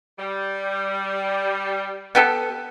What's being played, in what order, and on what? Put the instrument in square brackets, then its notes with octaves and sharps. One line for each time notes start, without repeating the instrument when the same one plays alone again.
[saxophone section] G3
[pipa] B3 G4 A4